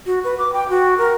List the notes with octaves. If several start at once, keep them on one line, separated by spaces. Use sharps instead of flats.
F#4
B4
D6
G5
F#4
A#4